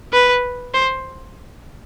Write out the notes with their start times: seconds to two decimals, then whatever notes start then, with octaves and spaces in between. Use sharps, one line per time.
0.13 B4
0.75 C5